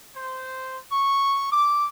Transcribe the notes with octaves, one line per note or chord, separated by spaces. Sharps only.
C5
C#6
D6